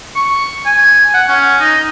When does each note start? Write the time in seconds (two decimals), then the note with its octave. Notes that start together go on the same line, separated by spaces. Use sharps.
0.15 C#6
0.65 G#5
1.14 F#5
1.29 C#4
1.60 D#4